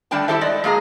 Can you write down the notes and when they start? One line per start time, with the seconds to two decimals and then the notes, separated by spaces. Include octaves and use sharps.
0.11 D3 G3 A3 D4 G5 A5
0.28 E4 F4 G4 A4 C5 E5
0.41 G#3 D5 D#5
0.64 G#3 A#3 G#4 A#5